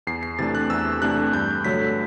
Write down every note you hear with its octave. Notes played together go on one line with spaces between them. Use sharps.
E2 C7
C7
C3 E3 A3 D4 A6
F#6
E2 E6
C3 E3 A3 D4 F#6
G2 G6
D3 F#3 A3 B6